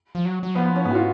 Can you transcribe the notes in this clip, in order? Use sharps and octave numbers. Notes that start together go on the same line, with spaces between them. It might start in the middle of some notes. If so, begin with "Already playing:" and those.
F3
F#3
F#3
F3 B3
B3
C#4
G#2 B3
F#4
F4